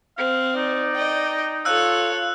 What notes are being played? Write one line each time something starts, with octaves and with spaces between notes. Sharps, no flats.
C4 F5
D#4 D5
D#5 G5
F4 A4 C#5 F5 E6 F#6